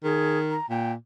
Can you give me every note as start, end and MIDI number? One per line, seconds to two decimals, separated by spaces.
0.04 0.56 51
0.04 0.38 68
0.50 0.69 82
0.70 0.94 46
0.70 0.92 79